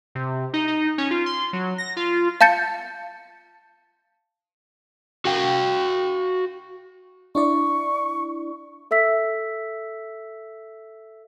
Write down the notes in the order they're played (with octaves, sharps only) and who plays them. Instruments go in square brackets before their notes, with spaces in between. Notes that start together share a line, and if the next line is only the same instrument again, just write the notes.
[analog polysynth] C3
D#4
D#4
C#4
F4
C6
F#3
A#6
F4
[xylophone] F5 A5 G6 A6 C#7
[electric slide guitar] F#4 F5 G5
[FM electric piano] D4 E4 D5 [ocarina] C#6
[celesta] A4 E5 E6 B6